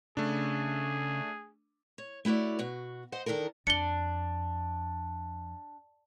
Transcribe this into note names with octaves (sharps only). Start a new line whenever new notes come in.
C#3 A3 D4 G#4
C#5
A3 E4 F#4 C#5 D5
B2 F#4
C5 D#5 F#5
E2 D#3 D4 A4 A#4
F2 D4 C#7 G7